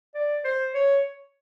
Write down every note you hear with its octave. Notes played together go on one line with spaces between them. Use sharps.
D5
C5
C#5